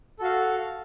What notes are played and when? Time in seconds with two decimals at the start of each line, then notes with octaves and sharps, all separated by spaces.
0.19 A4
0.22 F#4
0.24 F5